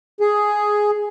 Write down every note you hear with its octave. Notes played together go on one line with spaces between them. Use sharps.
G#4